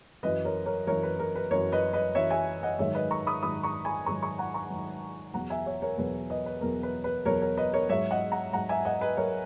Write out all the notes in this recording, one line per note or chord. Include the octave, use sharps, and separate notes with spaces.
F#2 E3 B4 D#5
A#4 C#5
A#4 C#5
F#2 E3 A#4 C#5
B4
A#4
B4
F#2 E3 A#4 C#5
B4 D#5
B4 D#5
F#2 E3 C#5 E5
E5 G#5
D#5 F#5
G#2 D#3 F#3 C#5 E5
B4 D#5
A#5 C#6
B5 D#6
G#2 D#3 F#3 B5 D#6
A#5 C#6
G#5 B5
G#2 D#3 F#3 A#5 C#6
A#5 C#6
F#5 A#5
A#5 C#6
G#2 D#3 F#3
E2 B2 F#3 F#5 A#5
E5 G#5
C#5 E5
A#4 C#5
E2 B2 F#3 B4
B4 D#5
B4
E2 B2 F#3 A#4
B4
B4
E2 B2 F#3 A#4 C#5
A#4 C#5
B4 D#5
A#4 C#5
G#2 F#3 C#5 E5
D#5 F#5
F#5 A#5
G#2 F#3 F#5 A#5
E5 G#5
D#5 F#5
B4 D#5
F#3 A#4 C#5